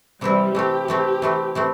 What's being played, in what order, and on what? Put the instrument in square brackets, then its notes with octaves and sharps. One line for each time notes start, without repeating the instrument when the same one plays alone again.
[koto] C3 E3 C4 E4 [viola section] G3
[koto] E3 A3 C4 [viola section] G4
[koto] E3 A3 C4
E3 A3 C4
E3 A3 C4